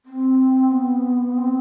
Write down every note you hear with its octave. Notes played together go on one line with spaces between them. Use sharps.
C4
B3
C4